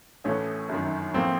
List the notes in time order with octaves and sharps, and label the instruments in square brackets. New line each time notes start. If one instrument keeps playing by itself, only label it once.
[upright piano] A1 A2 E3 A3 [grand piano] C#4
[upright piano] G1 F#2 D#3
[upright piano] A1 A2 F3 A#3 [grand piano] C4